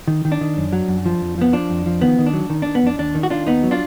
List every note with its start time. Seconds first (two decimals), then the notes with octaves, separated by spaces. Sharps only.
0.08 D#3
0.25 D#3
0.32 D4
0.41 D#3
0.57 F#2
0.73 F#3
0.88 F#2
1.06 F3
1.21 F2
1.38 F3 B3
1.53 F3 D4
1.70 F2
1.86 F3
2.01 D#3 B3
2.19 D#3
2.27 D4
2.34 F#3
2.50 D#3
2.62 D#3 D4
2.75 B3
2.83 F2 D4
2.99 D#2 D4
3.15 D#3
3.23 F#4
3.30 D#3 D4 F4
3.47 D#2 B3 D#4
3.63 F#3
3.71 D4 F4